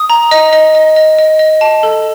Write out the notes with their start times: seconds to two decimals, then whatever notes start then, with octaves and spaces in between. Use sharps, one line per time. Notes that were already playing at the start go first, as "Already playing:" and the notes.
Already playing: D#6
0.10 A#5
0.31 D#5
0.53 D#5
0.75 D#5
0.96 D#5
1.19 D#5
1.39 D#5
1.61 A5
1.83 A4